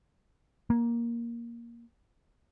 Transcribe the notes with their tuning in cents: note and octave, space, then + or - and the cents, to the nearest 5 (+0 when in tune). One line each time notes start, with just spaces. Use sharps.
A#3 +10